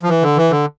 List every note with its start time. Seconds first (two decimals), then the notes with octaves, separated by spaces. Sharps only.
0.03 F3
0.09 E3
0.23 D3
0.37 E3
0.51 D3